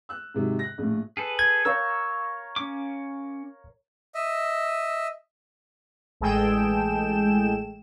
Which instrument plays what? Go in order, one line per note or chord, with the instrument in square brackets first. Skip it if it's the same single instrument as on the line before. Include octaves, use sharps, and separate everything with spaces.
[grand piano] E6 F#6
G#2 C3 D#3 F#3
F#6 A#6
A#1 A2
[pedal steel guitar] G#4 A4 B4
[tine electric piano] G#6
[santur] A#4 C#5 F5 [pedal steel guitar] E6 G6
[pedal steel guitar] C#4 D6
[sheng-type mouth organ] D#5 E5
[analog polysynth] A1 G#3 G#4 A4 G5 E7